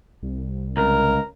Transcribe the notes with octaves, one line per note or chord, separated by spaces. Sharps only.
C2
C#2 A#4